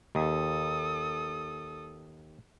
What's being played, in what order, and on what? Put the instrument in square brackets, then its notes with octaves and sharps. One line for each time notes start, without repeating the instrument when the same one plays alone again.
[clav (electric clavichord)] D#2 [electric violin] A4 D#6